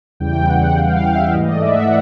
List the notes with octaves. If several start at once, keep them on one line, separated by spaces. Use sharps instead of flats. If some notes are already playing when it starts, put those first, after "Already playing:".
E2 C#3 E3 G3 G5
F#5
F5
F5
E5
G#2 E3 A3 D#5
D5
E5
F#5